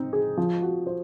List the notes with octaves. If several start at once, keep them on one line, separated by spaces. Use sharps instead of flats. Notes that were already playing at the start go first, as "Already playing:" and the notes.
Already playing: C4 D#4
G#4
F3
F#4
C5